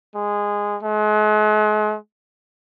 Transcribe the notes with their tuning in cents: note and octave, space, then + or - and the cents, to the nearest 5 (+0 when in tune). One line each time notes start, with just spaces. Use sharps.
G#3 -15
G#3 +40